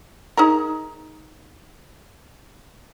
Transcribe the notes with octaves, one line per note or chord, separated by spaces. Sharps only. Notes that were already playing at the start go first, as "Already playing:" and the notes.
D#4 G#4 A#4